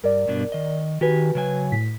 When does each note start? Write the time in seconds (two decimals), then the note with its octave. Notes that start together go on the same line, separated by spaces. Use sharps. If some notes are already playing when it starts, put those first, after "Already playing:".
0.04 G2 A#4 D5
0.28 G2 B2 D4
0.52 D#3 D#5
1.01 D#3 F#4 G4 B4 G#5
1.35 C#3 F#3 G#5
1.72 A2 B6